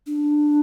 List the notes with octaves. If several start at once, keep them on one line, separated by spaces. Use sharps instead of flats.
D4